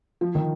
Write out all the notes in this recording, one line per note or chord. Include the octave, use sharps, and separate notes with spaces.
F3
D#3